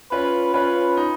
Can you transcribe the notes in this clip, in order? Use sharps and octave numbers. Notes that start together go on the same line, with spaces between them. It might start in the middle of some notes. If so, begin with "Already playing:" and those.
C#4 F4 B4
C#4 F4 B4
D#4